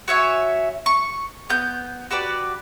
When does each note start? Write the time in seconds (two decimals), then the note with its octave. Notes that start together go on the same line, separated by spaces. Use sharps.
0.08 F#4 C#5 E5 G#5
0.86 C#6
1.49 B3 G6
2.11 F#4 G4 B4 D5